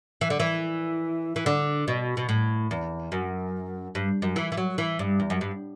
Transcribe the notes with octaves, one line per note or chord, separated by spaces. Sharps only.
E3
D3
E3
E3
D3
B2
B2
A2
E2
F#2
G2
F#2
E3
E3
F#3
E3
G2
E2
F#2
G2